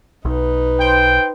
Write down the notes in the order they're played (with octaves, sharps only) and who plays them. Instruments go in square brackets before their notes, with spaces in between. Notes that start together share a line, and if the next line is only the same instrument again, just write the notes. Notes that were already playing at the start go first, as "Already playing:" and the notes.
[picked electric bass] B1 [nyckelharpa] D#4 B4
[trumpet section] C5 G5